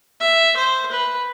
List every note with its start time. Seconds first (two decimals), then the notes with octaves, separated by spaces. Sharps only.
0.21 E5
0.57 C5
0.92 B4